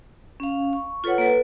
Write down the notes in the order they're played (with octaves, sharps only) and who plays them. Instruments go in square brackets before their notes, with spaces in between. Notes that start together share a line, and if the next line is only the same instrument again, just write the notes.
[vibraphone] C#4 F5
C#6
F4 A4 B4 C#5 F#5
A#3 A4 B4